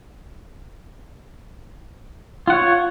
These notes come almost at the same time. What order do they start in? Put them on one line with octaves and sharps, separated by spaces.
F4 F#5 C#5